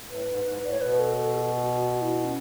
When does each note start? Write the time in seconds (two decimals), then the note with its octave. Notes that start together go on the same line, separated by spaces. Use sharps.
0.09 A2 B4
0.28 G#2
0.45 G#2
0.63 A2 D5
0.73 C#5
0.81 B2 B4
1.00 A4
1.17 A4
1.35 F#4
1.77 F#4
2.01 E4
2.25 C#4